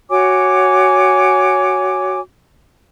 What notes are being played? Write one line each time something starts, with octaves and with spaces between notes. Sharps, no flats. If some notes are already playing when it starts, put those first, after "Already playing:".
F#4 C#5 G#5 D6